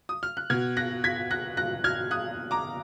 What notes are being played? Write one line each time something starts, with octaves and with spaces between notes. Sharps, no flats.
D#6
F6
F#6
B2 F6 G#6
F#6 A#6
G#6 B6
F#6 A#6
F#6 A#6
F6 G#6
D#6 F#6
A#5 D6